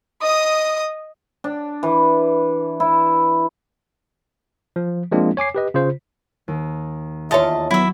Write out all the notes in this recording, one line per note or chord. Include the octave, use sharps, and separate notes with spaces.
D#5 D#6
D4
E3
E4
F3
F3 G#3 A#3 C4 D4 F4
C#5 G#5 D6 C7
G4 B4 D#5
C#3 F4 C5
D#2
E2 F4 C#5 D#5 E5 A5
F#3 B3 E4 E5 C#6 A6